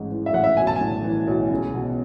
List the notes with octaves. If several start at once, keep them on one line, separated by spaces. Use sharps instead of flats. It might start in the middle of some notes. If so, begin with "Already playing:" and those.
Already playing: A1 G#2
E3
E5
A1 F#5
E5
B1 G#5
A5
G#5
A2
E3
B1
C#2
B2